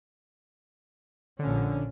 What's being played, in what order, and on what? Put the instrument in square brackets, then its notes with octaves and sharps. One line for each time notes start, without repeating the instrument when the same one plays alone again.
[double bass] A#1 C#4 [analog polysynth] D3